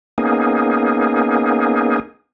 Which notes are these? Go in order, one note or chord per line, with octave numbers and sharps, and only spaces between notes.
A#3 B3 C#4 D#4 G#4